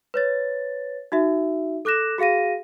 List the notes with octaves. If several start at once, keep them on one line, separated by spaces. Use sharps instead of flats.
B4 C#5 A6
D#4 F#4 E5
A4 D6 F#6 A#6 E7
F#4 G#4 F5 A#6 D#7